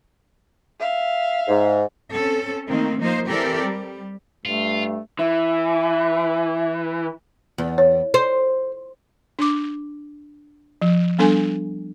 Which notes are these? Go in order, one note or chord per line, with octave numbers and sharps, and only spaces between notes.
E5 F5
G#2
C4 C#4 A4
D#3 A3 A#3 C4
F3 A#3 D#4 C5
E3 C4 G4 A4 A#4 D5
G3
G2 A3 F4
E3 E5
E2
C#5
C5
D4 D6
F3
G3 B3 D4 A4 G#5